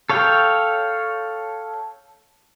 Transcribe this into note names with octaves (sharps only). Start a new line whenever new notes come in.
A4 C#5 F5 G5